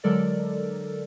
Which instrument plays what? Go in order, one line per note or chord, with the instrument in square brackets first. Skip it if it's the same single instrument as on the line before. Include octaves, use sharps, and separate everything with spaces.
[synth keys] D3 F#3 G#3 A4 A#4 D5